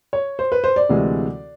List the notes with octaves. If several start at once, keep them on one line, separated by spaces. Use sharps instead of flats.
C#5
C5
B4
C5
D5
D2 C3 E3 G#3